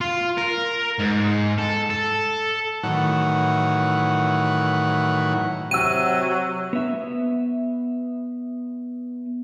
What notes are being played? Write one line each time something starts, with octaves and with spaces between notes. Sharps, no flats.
F4
A#4
G#2
A4
A4
A2 D#3 E3 F#3 F#5
C3 F#3 F#5 E6 D#7
B3 E5